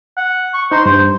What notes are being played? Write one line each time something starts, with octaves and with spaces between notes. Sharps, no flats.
F#5
C#6
D#4 C5 A#5 C6
G2 C5